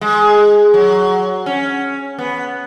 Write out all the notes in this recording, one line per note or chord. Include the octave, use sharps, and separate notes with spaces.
G#3
F#3
C#4
B3